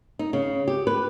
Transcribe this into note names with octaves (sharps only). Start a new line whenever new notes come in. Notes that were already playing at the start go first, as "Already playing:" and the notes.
D#4
C#3
G4
B4